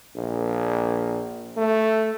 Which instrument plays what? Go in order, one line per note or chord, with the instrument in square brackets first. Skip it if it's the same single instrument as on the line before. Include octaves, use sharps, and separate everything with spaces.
[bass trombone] A#1
A3